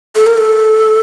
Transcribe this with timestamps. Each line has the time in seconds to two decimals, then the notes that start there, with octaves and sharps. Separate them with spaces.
0.16 A4
0.27 A#4
0.38 A4